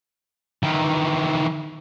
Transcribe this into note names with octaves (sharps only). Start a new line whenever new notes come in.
D#3 E3